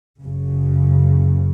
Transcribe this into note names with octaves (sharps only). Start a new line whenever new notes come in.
F#1 F#2 C#3